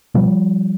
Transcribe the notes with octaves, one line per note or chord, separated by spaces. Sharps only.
B2 F3 G3